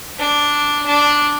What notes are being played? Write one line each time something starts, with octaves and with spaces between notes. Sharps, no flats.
D4
D4